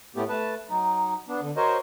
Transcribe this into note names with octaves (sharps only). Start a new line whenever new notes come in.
A2 A3 B3 G4
A3 B4 A5
F#3 D#4
B3 D4
D3
F#4 A#4 C5 C#5 D#5